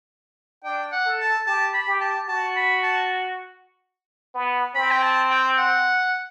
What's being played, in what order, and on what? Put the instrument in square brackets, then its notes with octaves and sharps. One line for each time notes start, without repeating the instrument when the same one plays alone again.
[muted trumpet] D4 [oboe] G5
[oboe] F#5
[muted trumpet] A4
[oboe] A5
[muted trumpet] G4 [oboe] A5
[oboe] B5
[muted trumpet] G4
[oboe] A5
[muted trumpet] F#4 [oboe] A5
[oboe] B5
A5
[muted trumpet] B3
[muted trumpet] C4 [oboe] B5
[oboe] G5
A5
G5
F#5